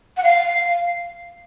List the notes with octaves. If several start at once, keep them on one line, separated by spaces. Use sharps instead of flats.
F#5
F5